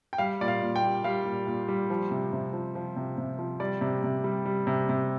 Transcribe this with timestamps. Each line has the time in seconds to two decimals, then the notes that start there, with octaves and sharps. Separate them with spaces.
0.13 G5
0.18 G3 F5
0.41 A#2 D5
0.48 F5
0.62 A#2
0.76 G5
0.84 G3
1.04 G3 F5
1.26 A#2
1.47 A#2
1.68 G3
1.90 F3
2.11 C3
2.33 C3
2.53 F3
2.75 F3
2.96 C3
3.18 C3
3.39 F3
3.60 G3 D5
3.81 C3
4.04 C3
4.24 G3
4.46 G3
4.67 C3
4.89 C3